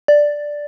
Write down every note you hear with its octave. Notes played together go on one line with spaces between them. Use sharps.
D5